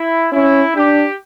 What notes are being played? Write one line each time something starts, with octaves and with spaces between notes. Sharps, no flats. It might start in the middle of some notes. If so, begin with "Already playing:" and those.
Already playing: E4
C#4 E4
D4 G4